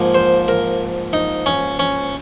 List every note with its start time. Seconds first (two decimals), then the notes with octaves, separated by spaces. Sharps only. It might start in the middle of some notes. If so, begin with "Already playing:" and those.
Already playing: G#2 F3 A#3
0.14 C5
0.48 A#4
1.13 D#4
1.46 C#4
1.79 C#4